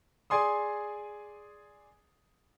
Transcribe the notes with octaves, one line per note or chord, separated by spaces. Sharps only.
G#4 D5 G#5 C6 D#6